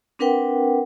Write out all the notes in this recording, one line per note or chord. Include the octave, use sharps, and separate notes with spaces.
C4 D4 A#4 B4 F#5 G5